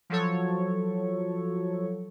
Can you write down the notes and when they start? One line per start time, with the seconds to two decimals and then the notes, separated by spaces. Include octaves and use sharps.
0.10 F3 F#3 A4 C#5